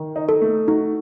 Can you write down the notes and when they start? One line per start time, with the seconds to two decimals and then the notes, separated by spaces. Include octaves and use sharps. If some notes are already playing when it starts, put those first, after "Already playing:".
Already playing: D#3
0.16 D#4
0.29 A4
0.42 A3
0.68 D#4 F#4